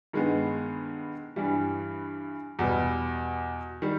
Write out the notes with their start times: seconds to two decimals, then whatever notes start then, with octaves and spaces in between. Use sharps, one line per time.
0.13 G2 D#3 G#3 B3
1.36 G2 E3 G3
2.59 E2 B2 G3 B3
3.82 D#3 G3